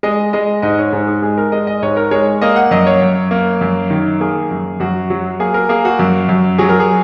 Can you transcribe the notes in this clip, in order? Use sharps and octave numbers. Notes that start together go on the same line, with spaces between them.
G#3 D#5
G#3 D#5
G#2 D#5
C#5
G#2 G#4
G#4
G#3 G#4
A#4
G#3 D#5
D#5
G#2 C#5
A#4
G#3 C#5
A#3 D#5
F#5
F#2 D#5
C#5
F#2
A#3
F#2
D#3
A#3 G#4
F#2
F#2 F#4
F#3
A#3 G#4
A#4
A#3 G#4
F#4
F#2
F#2
F#3 G#4
A#4
G#4